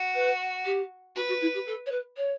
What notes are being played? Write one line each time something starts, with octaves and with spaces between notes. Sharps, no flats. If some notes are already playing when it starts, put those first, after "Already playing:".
Already playing: F#4
B4
G4
F#4 B4
F#4
E4
G4
A4
C#5
B4
C#5